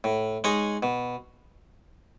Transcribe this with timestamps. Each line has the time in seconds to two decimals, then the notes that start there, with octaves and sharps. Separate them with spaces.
0.04 A2
0.44 G#3 D#4 G#4 C#5
0.83 B2